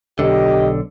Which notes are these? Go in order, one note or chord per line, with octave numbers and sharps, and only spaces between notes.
B1 D3 G4 D#5